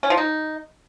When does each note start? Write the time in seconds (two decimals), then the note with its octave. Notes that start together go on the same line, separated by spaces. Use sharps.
0.03 C#4
0.10 F3
0.17 D#4